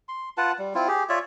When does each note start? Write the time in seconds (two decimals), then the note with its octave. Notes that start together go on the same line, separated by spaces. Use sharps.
0.09 C6
0.37 F4 B4 F#5 A5
0.59 G3
0.75 C4 E4 F4
0.88 G4 G#4
1.09 F4 C#5 D5 E5